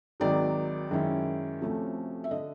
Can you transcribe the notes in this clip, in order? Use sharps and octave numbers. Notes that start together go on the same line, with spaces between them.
G#1 G#2 D#3 F#3 D5
F#2 D#3 G#3 C#4 E4
D2 C3 F3 A3 C#4
E5
D3 D#5